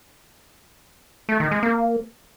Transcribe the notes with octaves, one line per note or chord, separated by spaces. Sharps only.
A3
D#3
G#3
A#3